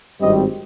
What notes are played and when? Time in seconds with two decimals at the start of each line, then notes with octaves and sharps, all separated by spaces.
0.20 G#1 G2 G3 C4 D#5